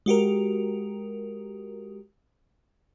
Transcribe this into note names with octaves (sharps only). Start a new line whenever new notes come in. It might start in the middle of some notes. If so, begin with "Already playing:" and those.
G#3 F#4 G4 A#4